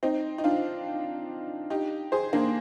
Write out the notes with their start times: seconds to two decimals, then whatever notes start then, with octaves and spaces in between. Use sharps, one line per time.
0.03 C4 D#4
0.38 D#4
0.44 D4 F4
1.70 D#4 G4
2.12 G#4 C5
2.33 A#3 D4